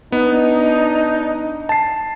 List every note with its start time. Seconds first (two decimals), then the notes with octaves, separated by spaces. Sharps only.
0.12 B3 D4 D#4
1.69 A5 C7